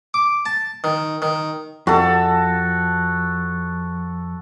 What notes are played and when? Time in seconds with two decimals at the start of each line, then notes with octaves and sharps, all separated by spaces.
0.14 D6
0.46 A5
0.84 D#3
1.22 D#3
1.87 F2 F#4 A4